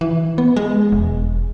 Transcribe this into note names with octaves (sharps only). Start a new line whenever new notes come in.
E3
B3
G#3
E1